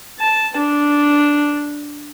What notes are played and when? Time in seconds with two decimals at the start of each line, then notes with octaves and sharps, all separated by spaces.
0.19 A5
0.57 D4